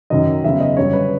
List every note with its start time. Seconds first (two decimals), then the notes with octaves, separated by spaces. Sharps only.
0.10 F#2 D#3 F#3 D#5
0.44 E2 C#3 F#3 E5
0.60 D#5
0.77 F#2 D3 G3 C#5
0.93 B4